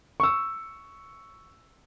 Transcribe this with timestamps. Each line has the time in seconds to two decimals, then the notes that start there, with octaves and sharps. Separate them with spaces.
0.20 C#6 E6